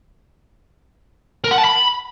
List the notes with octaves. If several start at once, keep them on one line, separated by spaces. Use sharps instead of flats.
A#4
F#5
A5
B5